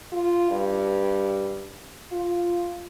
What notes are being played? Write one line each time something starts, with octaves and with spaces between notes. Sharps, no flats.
F4
G2
F4